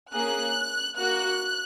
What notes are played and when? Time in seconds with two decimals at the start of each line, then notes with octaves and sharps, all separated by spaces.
0.13 A#3 C#4 G#4 F#6
0.98 A#3 F#4 F#6